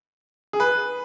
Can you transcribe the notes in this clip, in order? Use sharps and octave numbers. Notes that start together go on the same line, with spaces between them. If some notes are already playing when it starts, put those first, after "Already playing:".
G#4
B4